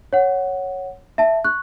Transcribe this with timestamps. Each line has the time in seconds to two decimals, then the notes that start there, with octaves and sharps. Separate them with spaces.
0.13 C#5 F#5
1.18 E5 A5
1.44 C#6 F#6